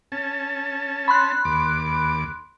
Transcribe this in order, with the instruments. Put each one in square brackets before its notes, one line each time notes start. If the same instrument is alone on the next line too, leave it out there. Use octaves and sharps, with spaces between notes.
[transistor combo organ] C#4 A5
[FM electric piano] B5 C6 F#6
[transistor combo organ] D#2 D6